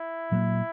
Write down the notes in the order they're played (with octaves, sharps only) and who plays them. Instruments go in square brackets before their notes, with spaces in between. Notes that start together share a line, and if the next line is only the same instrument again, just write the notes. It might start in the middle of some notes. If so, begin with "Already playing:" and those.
Already playing: [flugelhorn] E4
[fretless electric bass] A#2 F#3 A#3